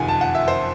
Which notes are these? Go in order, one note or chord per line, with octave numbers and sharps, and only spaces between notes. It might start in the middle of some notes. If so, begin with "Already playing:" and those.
Already playing: F#1 F2 C3 D#3 F#5 G#5
A5
F#5
E5
C5